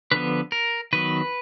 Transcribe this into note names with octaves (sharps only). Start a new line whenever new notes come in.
D3 F3 B3 B4
A#4
D#3 F#3 B3 B4